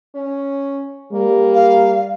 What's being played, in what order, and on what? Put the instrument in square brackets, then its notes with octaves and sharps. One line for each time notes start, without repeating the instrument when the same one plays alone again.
[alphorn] C#4
[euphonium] G3 [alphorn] A#3
[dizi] F5